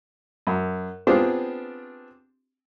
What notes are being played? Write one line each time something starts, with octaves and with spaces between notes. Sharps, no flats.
F#2
B3 C4 D4 F4 G4 G#4